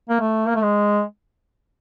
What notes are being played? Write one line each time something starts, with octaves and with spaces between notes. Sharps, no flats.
A#3
A3
A#3
A3
G#3